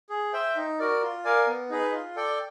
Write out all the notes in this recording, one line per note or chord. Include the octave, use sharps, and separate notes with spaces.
G#4
C5 E5 G5
D#4
F#4 A#4 D5
F4
A#4 D5 F5 G#5
B3
D#4 G#4 B4 D#5
F4
A4 D5 G5